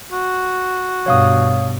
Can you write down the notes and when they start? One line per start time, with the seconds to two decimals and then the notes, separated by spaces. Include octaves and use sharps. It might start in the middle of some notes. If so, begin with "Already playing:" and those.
0.12 F#4
1.06 G2 B2 C#5 F5 D#6